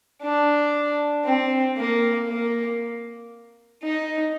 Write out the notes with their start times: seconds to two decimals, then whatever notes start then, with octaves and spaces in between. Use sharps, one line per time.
0.22 D4
1.25 C4
1.77 A#3
2.29 A#3
3.84 D#4